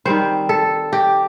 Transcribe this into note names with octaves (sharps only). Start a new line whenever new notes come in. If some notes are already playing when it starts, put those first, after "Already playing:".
D#3 G3 C4 C5
A4
G4